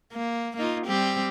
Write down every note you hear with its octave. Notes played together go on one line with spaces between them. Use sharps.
A#3
A#3 D#4 F4
G3 C4 G4